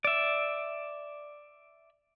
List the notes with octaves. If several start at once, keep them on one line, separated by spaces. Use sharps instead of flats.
D5 E5